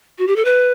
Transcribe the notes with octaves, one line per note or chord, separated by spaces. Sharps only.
F#4
G4
A4
B4